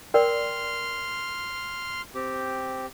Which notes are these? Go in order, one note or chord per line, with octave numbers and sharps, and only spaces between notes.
A#4 D5 G5 C6 F6
C4 G4